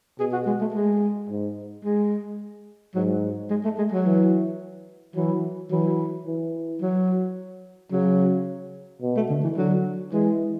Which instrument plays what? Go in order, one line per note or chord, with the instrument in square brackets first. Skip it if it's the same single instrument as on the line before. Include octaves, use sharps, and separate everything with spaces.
[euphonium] B2 [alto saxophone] G#4
[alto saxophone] F#4
G#3
A3
G#3
[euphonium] G#2
[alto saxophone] G#3
[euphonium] G#2 [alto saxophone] F#3
[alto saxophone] G#3
A3
G#3
F#3
[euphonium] E3
[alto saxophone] E3 [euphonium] F#3
[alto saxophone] E3 [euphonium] F#3
[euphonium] E3
[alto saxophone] F#3
[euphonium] C#3 [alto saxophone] F#3
[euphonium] B2
[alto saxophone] A3
D3
E3
[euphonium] D3 [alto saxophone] F#3
[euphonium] E3 [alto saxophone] G#3